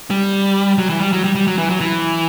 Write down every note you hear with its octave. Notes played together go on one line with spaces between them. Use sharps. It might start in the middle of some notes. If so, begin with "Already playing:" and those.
G3
F#3
E3
G3
F#3
G3
G3
F#3
E3
F#3
E3